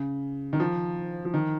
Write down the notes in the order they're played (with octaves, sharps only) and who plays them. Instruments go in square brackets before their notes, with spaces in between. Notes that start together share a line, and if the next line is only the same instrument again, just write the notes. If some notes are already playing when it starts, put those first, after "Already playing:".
Already playing: [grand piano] C#3
D#3
F3
F3
D#3